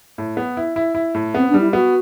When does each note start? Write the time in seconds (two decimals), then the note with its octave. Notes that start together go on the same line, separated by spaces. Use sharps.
0.18 A2
0.37 B3
0.57 E4
0.76 E4
0.95 E4
1.14 A2
1.35 B3 C4
1.49 G3 D4
1.60 E4
1.73 B3 F#4